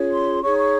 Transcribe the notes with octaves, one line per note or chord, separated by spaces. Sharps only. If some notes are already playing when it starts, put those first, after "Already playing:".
Already playing: C#4 F4 G#4 C#5
C6
D#4 G#4 C#5 C#6
C#6